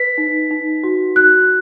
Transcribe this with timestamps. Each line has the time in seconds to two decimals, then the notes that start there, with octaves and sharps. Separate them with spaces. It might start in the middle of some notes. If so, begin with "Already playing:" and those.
Already playing: B4 B6
0.18 D#4
0.51 D#4
0.83 F#4
1.16 F#4 F#6